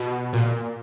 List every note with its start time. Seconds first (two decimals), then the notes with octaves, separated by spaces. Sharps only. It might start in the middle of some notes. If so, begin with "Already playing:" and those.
Already playing: B2
0.33 A#2